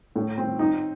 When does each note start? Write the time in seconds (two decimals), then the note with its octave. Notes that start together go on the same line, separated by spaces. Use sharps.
0.16 A2
0.38 C4
0.59 D#4